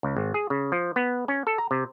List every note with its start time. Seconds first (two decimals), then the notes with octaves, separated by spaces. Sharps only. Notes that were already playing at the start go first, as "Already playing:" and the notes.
0.03 C#2
0.16 G#1
0.34 G#4
0.50 C#3
0.72 F3
0.96 B3
1.28 C#4
1.47 A4
1.58 A#5
1.71 C3